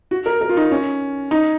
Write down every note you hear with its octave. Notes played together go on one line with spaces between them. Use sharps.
F#4
A#4
A#4
F4
D#4
C#4
D#4